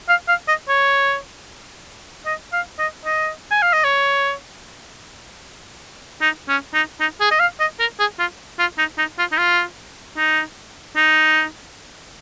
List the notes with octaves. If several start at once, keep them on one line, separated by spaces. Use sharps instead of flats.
F5
F5
D#5
C#5
D#5
F5
D#5
D#5
G#5
F5
D#5
C#5
D#4
C#4
D#4
D#4
G#4
D#5
F5
D#5
A#4
G#4
F4
F4
D#4
D#4
F4
D#4
F4
D#4
D#4